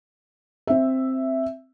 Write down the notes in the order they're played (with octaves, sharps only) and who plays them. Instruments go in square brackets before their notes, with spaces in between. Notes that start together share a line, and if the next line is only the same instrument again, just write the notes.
[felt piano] C4 E5